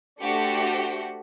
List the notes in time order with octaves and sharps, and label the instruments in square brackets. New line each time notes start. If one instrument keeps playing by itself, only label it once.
[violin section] A3 D4 F#4 G4 C5 C#7